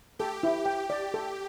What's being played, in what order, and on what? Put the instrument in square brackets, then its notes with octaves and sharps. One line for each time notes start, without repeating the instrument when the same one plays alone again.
[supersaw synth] G4 [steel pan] A4
[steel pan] E4
G5
[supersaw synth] G4 [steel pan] D5
[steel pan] A4